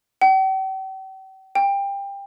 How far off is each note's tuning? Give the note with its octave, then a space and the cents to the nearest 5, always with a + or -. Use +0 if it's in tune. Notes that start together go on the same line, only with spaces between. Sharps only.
G5 -45
G5 +20